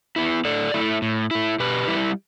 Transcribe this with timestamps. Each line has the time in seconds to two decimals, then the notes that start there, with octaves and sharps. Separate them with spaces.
0.16 B3 E4
0.45 A2 A4 D5
0.74 A3 E4
1.02 A2
1.31 A3 E4
1.60 B2 G4 B4
1.88 G3 E4